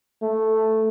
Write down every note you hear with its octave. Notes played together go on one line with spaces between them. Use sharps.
A3